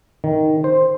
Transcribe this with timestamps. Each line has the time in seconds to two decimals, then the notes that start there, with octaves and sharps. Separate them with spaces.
0.24 D#3
0.64 C5